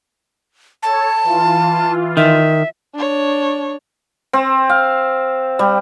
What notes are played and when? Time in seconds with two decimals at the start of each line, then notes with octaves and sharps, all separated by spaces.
0.83 A4 C#5 A5
1.24 E3 F4
2.17 D#3 E5
2.94 D4 C#5
4.33 C4
4.69 F5
5.59 G3